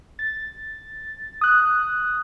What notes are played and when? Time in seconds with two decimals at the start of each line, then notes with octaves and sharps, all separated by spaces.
0.19 A6
1.41 D#6 F#6